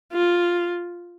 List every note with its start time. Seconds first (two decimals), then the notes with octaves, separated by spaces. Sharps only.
0.13 F4